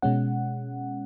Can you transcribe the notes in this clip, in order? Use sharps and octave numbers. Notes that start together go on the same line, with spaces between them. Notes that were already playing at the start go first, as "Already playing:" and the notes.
B2 G#3 C#4 F#5